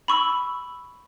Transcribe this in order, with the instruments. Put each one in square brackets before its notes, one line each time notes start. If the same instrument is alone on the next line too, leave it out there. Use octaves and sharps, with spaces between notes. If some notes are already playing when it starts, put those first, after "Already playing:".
[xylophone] B5 C#6 E6